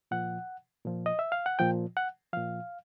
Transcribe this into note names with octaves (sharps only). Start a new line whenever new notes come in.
A#2 F3 F#5
A#2 F3
D#5
E5
F5
F#5
A#2 F3 G5
F#5
A#2 F3 F5